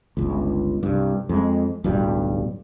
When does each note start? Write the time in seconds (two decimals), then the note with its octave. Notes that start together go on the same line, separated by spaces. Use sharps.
0.17 G1 C#2
0.83 C2 G2
1.29 F2 G#3
1.84 D1 B1 G2 G3